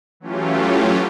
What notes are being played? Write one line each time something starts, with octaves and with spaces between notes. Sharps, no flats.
E3 F#3 A3 C#4 F4 G4